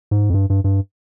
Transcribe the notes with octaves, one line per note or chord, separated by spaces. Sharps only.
G#2
F2
G2
G2
G2